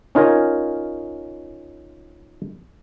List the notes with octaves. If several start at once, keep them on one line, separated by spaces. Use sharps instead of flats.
C#4 D#4 F4 A#4 G#5